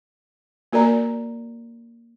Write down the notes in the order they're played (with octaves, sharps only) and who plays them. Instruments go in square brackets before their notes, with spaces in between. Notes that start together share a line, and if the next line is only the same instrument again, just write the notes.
[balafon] A#3 F#4 A#4 D5 A#5